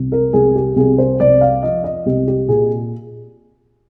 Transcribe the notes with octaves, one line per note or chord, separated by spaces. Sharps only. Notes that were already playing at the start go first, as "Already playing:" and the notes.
Already playing: C2
A#4
C2 G#4
G4
C2 G#4
C5
C2 D5
F5
F3 D#5
D#5
C2 G4
G4
A#2 G#4